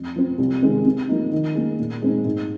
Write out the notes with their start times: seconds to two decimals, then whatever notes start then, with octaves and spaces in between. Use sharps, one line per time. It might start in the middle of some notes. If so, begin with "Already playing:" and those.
Already playing: F2
0.16 F3 C4
0.38 C2
0.62 C3 D#3 G#3 C4
0.86 C3
1.08 F3 A#3 D#4
1.32 D#3
1.55 A#3 G#4
1.79 A#2
2.02 G#3 C4 D#4
2.25 G#2